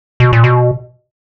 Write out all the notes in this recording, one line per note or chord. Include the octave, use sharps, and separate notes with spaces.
B2
A#2
B2